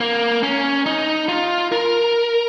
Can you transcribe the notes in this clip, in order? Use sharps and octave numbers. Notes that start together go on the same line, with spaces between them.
A#3
C#4
D#4
F4
A#4